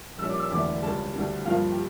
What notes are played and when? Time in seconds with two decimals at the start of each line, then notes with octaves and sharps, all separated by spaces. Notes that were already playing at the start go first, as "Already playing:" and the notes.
0.18 A#1 A#2 G3 C#4 E6
0.30 D6
0.39 E6
0.50 E1 E2 D3 A3 D4 D6
0.83 C#2 C#3 G3 A5
1.14 D2 D3 G3
1.45 G2 F3 A#3 F5
1.71 G4